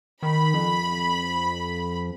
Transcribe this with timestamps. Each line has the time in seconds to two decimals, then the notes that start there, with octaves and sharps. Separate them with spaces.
0.23 D#3 B5
0.54 F2